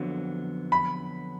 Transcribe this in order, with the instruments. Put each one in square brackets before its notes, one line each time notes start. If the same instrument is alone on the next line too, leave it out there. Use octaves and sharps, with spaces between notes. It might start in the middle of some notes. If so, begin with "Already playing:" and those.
Already playing: [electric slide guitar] F2 D3 F#3 B3
[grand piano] B5